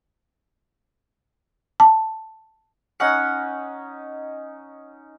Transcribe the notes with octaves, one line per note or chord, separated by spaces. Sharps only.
A5
C#4 D#4 C#5 F#5 F#6 C#7